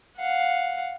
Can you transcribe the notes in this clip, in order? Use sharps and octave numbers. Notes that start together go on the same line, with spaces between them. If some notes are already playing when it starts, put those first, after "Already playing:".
F5 F#5